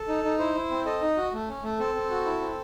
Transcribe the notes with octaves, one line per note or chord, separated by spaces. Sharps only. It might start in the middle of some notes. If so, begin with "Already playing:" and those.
Already playing: A4
D#4
D#4
E4 C5
E4
C4
A4 D#5
D#4
F#4
A3
C#4
A3
C4 A4
C4
F#4
E4
C4